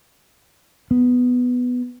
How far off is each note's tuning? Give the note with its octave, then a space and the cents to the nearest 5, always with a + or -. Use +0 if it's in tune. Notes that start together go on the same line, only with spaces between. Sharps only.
B3 +5